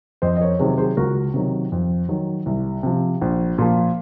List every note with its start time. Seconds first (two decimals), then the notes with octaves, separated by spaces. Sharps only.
0.22 F2 C5 D#5
0.37 D#5
0.41 A#4 C#5
0.59 C3 D#3 F#3 G#4 C5
0.78 G#4 C5
0.97 C#2 F#4 A#4
1.34 C3 D#3 F#3
1.72 F2
2.09 D#3 F#3
2.46 C2
2.83 C3 F3
3.21 A#1
3.58 A#2 F3